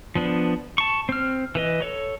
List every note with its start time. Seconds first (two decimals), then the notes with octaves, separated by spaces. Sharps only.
0.15 F3 B3 D4
0.78 A5 C#6
1.09 C4 F6
1.55 E3 B4 D#5
1.82 A4 C#5